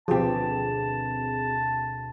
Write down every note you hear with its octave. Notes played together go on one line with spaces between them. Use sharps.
D2 B2 F3 B3 C4 G4 G#4 A5